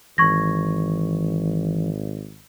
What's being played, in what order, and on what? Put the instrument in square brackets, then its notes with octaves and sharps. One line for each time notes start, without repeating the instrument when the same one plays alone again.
[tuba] G#1 [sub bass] E3 [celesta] C#6 G#6 A#6